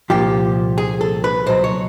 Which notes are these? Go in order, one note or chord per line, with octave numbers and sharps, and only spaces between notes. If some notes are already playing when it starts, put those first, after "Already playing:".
C2 A#2 F3 G4
G#4
A4
B4
C#2 B2 F#3 C5
C#5